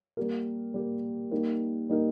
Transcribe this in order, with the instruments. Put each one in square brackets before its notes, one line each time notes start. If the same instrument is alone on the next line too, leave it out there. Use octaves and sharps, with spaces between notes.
[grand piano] G3 A#3 G4 A#4
G3 A#3 G4 A#4
G3 A#3 D#4 A#4
G3 A#3 D#4 A#4